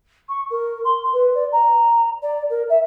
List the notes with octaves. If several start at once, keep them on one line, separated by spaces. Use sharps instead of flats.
C#6
A#4
C6
B4
D5
A#5
D5
A#4
E5